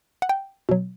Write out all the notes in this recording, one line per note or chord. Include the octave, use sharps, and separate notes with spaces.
F#5
G5
B2 F#3